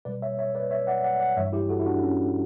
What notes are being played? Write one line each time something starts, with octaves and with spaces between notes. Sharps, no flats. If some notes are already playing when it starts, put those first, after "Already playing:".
B2 G3 B4 D5
C#5 E5
C#5 E5
B4 D5
C#5 E5
D5 F#5
D5 F#5
D5 F#5
G2 E3 G3 C#5 E5
E4 G4
F#4 A4
E4
D4 F#4
C#4